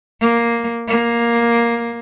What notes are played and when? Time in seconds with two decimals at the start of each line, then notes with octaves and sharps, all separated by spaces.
0.22 A#3
0.88 A#3